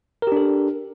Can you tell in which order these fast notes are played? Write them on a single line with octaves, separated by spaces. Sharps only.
A#4 G4 D4 A4